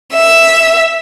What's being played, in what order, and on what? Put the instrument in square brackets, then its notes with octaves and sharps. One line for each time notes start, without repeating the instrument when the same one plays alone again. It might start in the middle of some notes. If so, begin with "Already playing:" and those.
[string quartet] E5